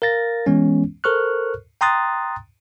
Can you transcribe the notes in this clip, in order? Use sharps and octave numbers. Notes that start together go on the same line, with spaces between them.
A#4 F5 A6 A#6
E3 G#3 B3 C#4
A4 A#4 C5 C#6 F6 F#6
G5 A#5 C6 D#6 F#6 A6